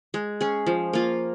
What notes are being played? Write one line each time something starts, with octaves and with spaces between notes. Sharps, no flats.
G#3
C#4 G#4
F3
A#3 F4